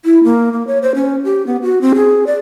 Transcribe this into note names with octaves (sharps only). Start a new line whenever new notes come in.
E4
A#3
A#3
C#5
C5
C#4
G4
B3
F#4
C4
G#4
D5